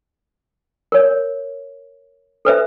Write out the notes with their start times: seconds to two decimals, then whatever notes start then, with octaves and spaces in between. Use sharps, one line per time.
0.92 A#4 C#5
2.45 A4 B4 C5 E5